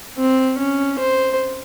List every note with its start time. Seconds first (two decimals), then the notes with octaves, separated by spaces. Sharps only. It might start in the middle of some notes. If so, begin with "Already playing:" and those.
0.17 C4
0.58 C#4
0.99 C5